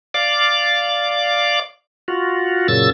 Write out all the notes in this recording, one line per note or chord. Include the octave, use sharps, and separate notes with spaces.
D5 F5 D6
F4 F#4
F#2 A#2 C#3 E6 A6